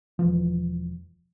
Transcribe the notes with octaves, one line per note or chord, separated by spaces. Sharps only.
E1 C#3 E3 F3